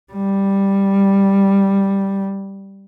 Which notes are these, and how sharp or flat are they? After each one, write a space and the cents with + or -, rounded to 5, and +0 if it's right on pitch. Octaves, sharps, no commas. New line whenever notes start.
G3 +5